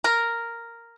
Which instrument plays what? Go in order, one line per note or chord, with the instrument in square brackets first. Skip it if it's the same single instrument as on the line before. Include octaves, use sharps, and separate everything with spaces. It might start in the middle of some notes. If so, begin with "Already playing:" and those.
[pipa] A#4